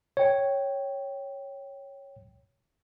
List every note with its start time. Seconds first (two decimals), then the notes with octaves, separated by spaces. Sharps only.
0.17 C#5 G5